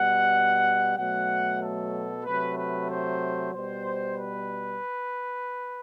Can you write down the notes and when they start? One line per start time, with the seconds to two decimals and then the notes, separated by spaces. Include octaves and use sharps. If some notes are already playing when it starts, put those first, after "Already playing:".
Already playing: B2 G3 F#5
0.97 B2 F#3 A3 F#5
1.61 A4
2.25 C3 F#3 A3 B4
2.57 B4
2.89 C5
3.52 B2 G3 C5
4.16 B4